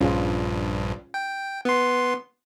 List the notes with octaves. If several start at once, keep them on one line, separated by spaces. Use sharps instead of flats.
A#1 G2 C#4 F4 G#4
G5
B3 C6